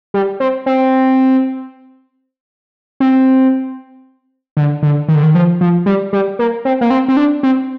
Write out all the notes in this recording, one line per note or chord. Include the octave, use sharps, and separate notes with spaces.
G3
C4
C4
C4
D3
D3
D#3
D3
D#3
F3
F3
G3
G3
A#3
C4
A#3
C4
C4
D4
C4